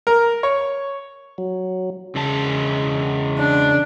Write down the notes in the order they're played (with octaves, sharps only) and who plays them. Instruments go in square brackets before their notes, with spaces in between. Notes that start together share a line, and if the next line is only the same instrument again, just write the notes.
[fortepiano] A#4
C#5
[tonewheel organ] F#3
[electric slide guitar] E2 G#3 A5 [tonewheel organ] C#3
[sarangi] D4